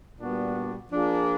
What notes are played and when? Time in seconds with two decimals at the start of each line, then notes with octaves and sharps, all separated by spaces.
0.19 A#2 G3 B3 D4 F#4
0.90 F3 A#3 D4 F4 G#4